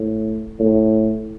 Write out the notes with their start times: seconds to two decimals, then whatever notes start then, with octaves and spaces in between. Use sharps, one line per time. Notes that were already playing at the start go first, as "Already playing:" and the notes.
Already playing: A2
0.59 A2